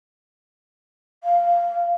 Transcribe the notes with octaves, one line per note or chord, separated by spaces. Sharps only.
F5